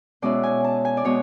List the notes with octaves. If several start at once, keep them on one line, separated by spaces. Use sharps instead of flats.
B2 G#3 C#4 E4 D5
G#5
A5
G#5
D5
B2 G#3 C#5